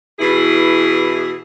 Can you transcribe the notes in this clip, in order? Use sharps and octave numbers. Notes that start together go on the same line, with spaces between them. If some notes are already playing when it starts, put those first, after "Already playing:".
B2 E3 E4 G#4